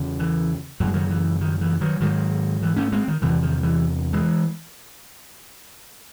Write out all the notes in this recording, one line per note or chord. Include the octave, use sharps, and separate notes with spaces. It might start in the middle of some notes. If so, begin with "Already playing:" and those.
Already playing: E2 C#3
E3
F#2 C#3 F#3
G#3
D#3 F#3
E3
D#3
E3
D#3 F#3
G#2 D#3 F#3
E3
A3 C#4
G#3 C4
D#3
E2 C3 E3
D#3
E3
E3 G#3